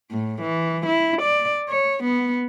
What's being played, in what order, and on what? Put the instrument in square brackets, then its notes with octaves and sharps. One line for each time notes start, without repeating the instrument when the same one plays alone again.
[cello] A2
E3
E4
D5
C#5
B3